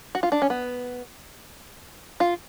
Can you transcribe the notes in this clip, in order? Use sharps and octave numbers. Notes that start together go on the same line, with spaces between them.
F#4
F4
D4
C#4
B3
F4